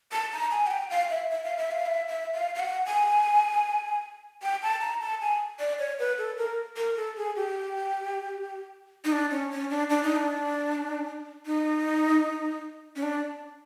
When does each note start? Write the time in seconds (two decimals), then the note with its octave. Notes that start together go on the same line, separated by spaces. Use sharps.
0.12 A5
0.33 A#5
0.51 G#5
0.67 F#5
0.71 G5
0.90 F5
1.10 E5
1.30 E5
1.44 F5
1.57 E5
1.71 F5
1.86 E5
2.08 E5
2.34 F5
2.55 F5
2.60 F#5
2.86 G#5
4.42 G5
4.63 A5
4.81 A#5
5.01 A5
5.21 G#5
5.60 D5
5.79 C#5
5.99 B4
6.18 A4
6.38 A#4
6.77 A#4
6.96 A4
7.17 G#4
7.36 G4
9.05 D#4
9.12 D4
9.31 C#4
9.51 C#4
9.70 D4
9.90 D4
10.03 D#4
10.16 D4
11.46 D#4
12.96 C#4
13.03 D4